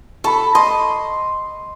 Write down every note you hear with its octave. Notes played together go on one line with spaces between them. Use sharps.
A4 B5 C#6
D#5 C6